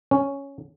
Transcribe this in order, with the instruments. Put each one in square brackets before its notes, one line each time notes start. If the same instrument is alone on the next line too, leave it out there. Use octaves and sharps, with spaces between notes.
[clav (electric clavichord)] C#4